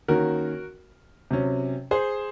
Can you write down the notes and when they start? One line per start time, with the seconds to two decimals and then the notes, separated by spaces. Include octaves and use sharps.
0.08 D#3 A#3 C#4 F#4 A#4
1.31 C3 F#3 C#4
1.91 G#4 C5